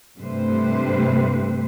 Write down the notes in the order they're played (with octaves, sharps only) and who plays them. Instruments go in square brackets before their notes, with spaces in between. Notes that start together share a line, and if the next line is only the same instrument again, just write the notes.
[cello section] G2 C3 A3 B4 C5